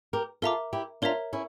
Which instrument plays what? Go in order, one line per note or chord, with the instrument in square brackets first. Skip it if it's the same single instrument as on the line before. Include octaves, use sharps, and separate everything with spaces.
[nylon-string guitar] G4 A#4
[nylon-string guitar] F4 A4 [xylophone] A#4 E5 A#5 D6
[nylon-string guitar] E4 G4
[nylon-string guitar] D4 F4 [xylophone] A#4 C#5 E5 A#5
[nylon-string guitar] C#4 E4